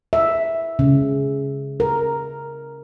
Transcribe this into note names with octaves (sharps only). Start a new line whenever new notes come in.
E5
C#3
A#4